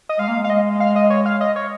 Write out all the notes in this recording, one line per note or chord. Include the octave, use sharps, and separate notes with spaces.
D#5
G#3 F5
A#3
G#3
F5
D#5
F5
D#5
C#5
F5
D#5
C#5